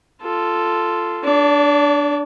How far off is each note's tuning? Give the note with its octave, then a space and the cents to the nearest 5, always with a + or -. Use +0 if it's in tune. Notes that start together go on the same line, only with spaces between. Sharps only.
F4 -10 A4 +0
D4 +0 D5 -40